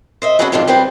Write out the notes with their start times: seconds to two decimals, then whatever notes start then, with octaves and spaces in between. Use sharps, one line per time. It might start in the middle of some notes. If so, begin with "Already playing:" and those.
0.22 C5 D#5 E5
0.39 C#4 D4 E4 F#4 G#4 B4
0.52 F2 G#2 D3 F3 D4 F4
0.68 G3 C4 B4 C5